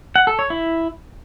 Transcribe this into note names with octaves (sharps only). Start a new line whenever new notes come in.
F#5
A4
C#5
E4